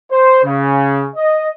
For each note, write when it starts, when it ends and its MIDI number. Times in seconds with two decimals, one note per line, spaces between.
0.11 0.41 72
0.44 1.06 49
1.16 1.49 75